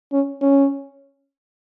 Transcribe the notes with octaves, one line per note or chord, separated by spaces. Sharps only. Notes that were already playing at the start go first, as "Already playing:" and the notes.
C#4
C#4